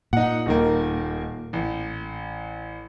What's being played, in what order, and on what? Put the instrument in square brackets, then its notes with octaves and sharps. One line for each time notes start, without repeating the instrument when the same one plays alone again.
[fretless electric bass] A#2 [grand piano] D#4 F#5
[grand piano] D#1 D#3 A#3
A1